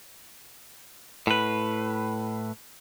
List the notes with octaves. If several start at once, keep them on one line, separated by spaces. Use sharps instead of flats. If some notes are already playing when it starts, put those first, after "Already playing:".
A2 B4